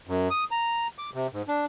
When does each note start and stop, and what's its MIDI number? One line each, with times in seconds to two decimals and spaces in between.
0.07 0.29 42
0.30 0.44 87
0.51 0.87 82
0.98 1.10 86
1.14 1.27 48
1.33 1.42 44
1.48 1.66 62